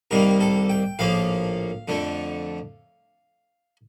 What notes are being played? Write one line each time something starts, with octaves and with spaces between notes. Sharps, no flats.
C2 C3 D#3 G3 A#3 A#4
A4
G5
A#1 A2 F3 A#3 F5
F2 D3 A3